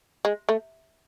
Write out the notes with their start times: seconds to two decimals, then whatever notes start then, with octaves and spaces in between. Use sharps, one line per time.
0.25 G#3
0.49 A3